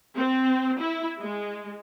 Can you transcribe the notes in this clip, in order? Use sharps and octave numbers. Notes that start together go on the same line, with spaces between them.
C4
E4
G#3